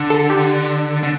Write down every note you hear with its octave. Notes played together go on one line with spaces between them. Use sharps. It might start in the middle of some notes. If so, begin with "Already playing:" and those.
Already playing: D3
A4
G4
D3